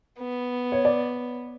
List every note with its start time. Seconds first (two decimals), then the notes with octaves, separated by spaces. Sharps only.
0.19 B3
0.72 C#5
0.85 D5